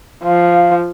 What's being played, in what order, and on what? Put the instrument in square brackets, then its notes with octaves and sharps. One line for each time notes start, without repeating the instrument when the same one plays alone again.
[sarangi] F3 [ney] F5